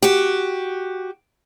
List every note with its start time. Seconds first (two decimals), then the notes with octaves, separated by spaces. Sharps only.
0.02 F#4 G4